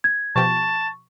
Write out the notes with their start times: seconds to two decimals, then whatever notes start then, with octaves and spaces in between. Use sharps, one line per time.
0.04 G#6
0.36 B2 F3 G4 A5 C#6